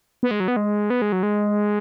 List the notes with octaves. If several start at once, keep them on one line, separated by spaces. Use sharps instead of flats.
B3
G#3
F#3
B3
G#3
B3
G#3
F#3
G#3